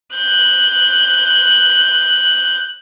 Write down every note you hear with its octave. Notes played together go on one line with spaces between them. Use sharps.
F#6 G6